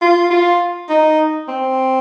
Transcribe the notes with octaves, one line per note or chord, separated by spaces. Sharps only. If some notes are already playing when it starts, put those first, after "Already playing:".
F4
F4
D#4
C4